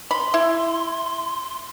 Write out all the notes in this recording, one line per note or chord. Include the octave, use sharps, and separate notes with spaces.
B5 C6
E4